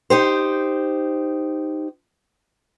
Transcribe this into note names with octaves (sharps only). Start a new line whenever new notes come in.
D#4 G4 C5